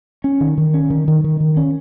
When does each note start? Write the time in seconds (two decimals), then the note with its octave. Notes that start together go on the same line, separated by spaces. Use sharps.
0.24 C#4
0.41 D#3
0.58 D#3
0.74 C#4
0.90 D#3
1.08 D#3
1.24 D#3
1.40 D#3
1.57 C#4